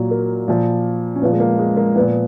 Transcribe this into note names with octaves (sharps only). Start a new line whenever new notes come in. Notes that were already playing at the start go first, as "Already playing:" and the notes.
Already playing: A#2 F#3
A#4
A#2 F3
C#4
A#2 F3 B3
G#3
A#3
G#3
A#3
A#2 F3 B3